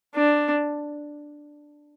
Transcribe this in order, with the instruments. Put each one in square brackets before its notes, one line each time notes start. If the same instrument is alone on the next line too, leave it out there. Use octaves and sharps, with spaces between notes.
[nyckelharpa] D4